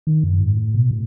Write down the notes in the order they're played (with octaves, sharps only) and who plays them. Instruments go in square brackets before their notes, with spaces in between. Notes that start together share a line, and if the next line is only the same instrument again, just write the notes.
[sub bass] D#3
F#2
G#2
A2
B2
A2